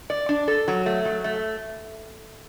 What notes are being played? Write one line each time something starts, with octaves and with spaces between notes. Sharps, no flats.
D5
D4
A4
F#3
A3
F#3
A3